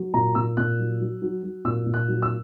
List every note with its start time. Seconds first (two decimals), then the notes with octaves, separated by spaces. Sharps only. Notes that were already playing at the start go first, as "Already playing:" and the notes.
Already playing: F#3
0.14 A#2 A#5
0.35 A#2 E6
0.57 A#2 F#6
0.79 F#3
1.00 F#3
1.22 F#3
1.43 F#3
1.65 A#2 E6
1.86 A#2
1.94 F#6
2.08 F#3
2.22 E6